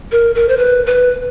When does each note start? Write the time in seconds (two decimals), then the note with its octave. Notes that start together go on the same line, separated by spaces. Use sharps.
0.12 A#4
0.35 A#4
0.49 C5
0.57 B4
0.86 B4